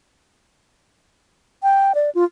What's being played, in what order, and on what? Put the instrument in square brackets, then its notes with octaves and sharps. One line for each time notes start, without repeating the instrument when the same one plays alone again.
[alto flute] G5
D5
F4